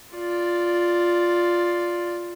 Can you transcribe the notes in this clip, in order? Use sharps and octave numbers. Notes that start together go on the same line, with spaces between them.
F4 D5